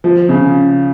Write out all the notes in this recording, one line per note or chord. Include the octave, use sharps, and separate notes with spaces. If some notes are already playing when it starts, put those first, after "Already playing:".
F3
C#3